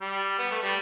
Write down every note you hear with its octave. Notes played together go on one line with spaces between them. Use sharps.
G3
B3
A3
G3